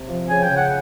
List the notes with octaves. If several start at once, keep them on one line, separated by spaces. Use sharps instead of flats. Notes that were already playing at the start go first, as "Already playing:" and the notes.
Already playing: C3
F3
C#3 G#5
G5
C#3
F#5